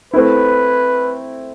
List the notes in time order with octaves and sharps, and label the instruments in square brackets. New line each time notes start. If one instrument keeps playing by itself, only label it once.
[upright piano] A3 C4 E4 [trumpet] B4